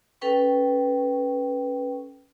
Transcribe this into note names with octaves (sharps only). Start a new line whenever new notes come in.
C#4 A4 B4 G5 C#6